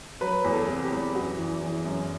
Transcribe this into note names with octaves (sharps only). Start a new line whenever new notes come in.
F#3 B4
E2
A4
C3
G4
E2
F#2 F#4
E3
E3
F#2